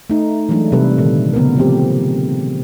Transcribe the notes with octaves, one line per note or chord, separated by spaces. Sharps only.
A3 D#4
E3 F#3 G#3 A3 D4
C3 G3 A4 B4
A#2 D3 D#3
C#3 B3 C4 A#4
F3 A3 B3 C4 G4